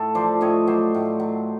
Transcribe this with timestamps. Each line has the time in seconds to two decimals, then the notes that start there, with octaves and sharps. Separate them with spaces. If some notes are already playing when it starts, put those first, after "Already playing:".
Already playing: A2 A4
0.15 F3 C5 D5
0.41 A2 C#5 D#5
0.67 F#3 C5 D5
0.94 A2
1.20 F#3